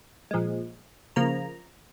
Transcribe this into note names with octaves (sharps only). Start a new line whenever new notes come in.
A#2 F3 G#3
C#3 F3 A#3 A#5